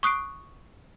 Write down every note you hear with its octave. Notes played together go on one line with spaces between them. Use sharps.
C#6 D#6 F#6 C7 D7